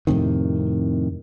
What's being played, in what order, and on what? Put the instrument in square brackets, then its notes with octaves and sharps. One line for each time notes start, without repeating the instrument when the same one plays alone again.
[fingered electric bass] F2 A2 C3 D#3